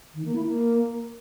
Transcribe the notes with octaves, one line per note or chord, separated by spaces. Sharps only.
D#3
A#3
E4
A#3